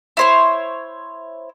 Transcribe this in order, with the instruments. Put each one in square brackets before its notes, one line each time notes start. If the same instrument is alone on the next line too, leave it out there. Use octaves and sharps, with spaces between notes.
[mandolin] E4 C5 C#5